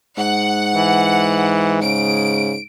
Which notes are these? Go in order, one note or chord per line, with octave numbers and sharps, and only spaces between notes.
G#2 F#5
E3
C#3 D7